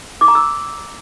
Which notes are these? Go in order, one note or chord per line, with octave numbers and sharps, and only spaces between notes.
D6
A#5
E6